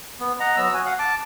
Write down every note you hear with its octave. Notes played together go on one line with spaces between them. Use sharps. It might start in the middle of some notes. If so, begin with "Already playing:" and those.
B3
D#5 F#5 A#5
F#3 B3 E6
F#4 G#5
F5 F#5
A5 D6